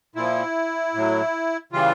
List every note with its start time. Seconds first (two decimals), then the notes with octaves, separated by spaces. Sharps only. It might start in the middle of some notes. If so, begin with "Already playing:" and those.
0.15 A#2 F3 E4
0.94 A2 F#3
1.72 C#3 E3 G3 F4